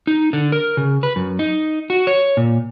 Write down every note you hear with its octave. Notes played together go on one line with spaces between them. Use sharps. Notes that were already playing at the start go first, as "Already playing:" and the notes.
D#4
D3
A#4
C#3
B4
F#2
D#4
F#4
C#5
A#2